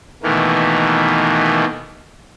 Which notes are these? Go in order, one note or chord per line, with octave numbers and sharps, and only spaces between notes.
B2 D#3 E3 A3 A#3